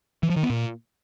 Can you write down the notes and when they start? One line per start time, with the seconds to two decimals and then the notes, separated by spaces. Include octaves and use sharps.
0.23 E3
0.30 F3
0.36 D#3
0.43 B3
0.50 A#2